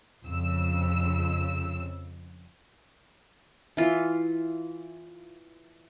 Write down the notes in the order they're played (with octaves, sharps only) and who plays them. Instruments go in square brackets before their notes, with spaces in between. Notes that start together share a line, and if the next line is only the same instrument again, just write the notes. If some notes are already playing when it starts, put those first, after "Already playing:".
[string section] F2 C#3 E6
[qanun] E3 F4